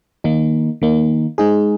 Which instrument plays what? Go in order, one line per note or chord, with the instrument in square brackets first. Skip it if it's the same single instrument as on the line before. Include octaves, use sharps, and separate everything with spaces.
[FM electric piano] D#3 A#3 D#4
D#3 A#3 D#4
G#3 D#4 G#4